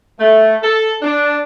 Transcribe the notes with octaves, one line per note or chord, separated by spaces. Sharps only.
A3
A4
D4